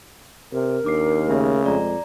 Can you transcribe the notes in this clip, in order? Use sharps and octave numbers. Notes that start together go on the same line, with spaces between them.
C3 A#4
D#2 D4 D6 C7
C#3 A3 E5
F2 G#3 D5 A#5